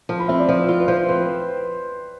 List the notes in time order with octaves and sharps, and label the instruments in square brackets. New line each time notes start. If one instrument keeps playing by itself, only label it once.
[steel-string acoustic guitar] F3 [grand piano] A5
[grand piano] B5
[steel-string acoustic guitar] C4 [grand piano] E5
[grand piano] D5
[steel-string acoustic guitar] F3 [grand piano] C5
[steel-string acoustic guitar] F4
[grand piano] B4
[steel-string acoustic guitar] F3 [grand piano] C5
[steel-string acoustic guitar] C4 [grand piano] B4